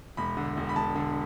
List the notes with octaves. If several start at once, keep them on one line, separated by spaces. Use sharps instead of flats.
E1 B5
D3
E1
B5
E1 A5
D3